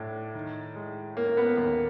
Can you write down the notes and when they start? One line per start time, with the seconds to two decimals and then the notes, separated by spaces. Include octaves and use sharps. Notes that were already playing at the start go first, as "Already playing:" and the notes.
Already playing: A2 D4
0.35 D#3
0.75 G#3
1.16 A#3 C#4
1.37 B3
1.57 D#2 A#3